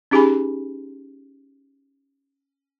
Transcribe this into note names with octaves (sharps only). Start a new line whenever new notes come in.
C#4 D#4 G4 G#4 G#5 B5